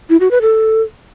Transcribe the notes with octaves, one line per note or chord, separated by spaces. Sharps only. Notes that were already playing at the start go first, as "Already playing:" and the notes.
E4
F#4
B4
A4